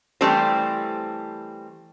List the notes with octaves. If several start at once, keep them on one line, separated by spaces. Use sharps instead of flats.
E3 G3 A3 C4 G4 C5